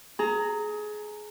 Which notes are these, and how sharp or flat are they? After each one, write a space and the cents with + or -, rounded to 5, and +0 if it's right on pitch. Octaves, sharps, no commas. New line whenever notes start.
G#4 +25 A#5 -15